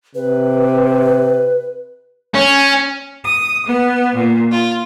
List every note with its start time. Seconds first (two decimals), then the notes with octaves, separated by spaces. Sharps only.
0.15 C3 B4
2.34 C#4
3.24 D#6
3.64 B3
4.14 A#2
4.52 F4